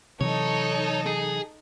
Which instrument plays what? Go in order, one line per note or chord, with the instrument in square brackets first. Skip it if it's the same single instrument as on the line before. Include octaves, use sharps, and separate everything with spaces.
[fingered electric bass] C3 E3 F#3 [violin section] D#4 A4 [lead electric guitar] C#5
[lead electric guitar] G#4